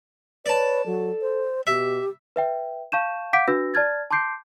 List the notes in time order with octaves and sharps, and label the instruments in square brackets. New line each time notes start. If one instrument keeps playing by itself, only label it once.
[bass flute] B4 [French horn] C#5 [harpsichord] D5 A5
[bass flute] F#3 [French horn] A4
[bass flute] C5
[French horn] B2 [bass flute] G4 [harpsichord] E5
[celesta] B4 E5 G5
F5 A5 C#6 G6 D#7 E7
F5 F#5 D6 G6 B6 D7
D4 F#4 B4 E6 A#6
D5 A5 F6 G#6 A6
A5 C6 D6 G6 C7 D7